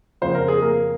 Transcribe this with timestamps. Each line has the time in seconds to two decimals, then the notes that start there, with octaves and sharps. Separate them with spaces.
0.21 F2 C#3 F3 A#3 C5
0.35 A#4
0.48 G#4
0.61 A#3 A#4